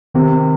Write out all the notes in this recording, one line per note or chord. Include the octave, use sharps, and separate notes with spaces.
C3 D#3